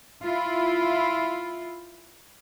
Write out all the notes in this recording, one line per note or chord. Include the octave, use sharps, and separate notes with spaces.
E4 F4